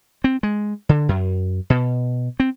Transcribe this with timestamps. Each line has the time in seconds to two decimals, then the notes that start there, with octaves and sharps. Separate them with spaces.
0.24 C4
0.43 G#3
0.89 D3
1.09 F#2
1.70 B2
2.40 C4